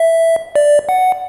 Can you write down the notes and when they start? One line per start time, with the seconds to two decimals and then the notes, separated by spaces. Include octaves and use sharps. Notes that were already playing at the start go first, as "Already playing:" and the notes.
Already playing: E5
0.56 D5
0.89 F#5